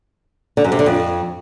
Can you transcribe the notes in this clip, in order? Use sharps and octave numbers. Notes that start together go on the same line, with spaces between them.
D3
F#2
C3
D3
F2